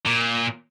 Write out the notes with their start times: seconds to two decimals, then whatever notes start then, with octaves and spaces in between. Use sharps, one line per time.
0.06 A#2